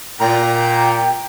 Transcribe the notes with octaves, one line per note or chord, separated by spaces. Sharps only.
A#2 G5 A#5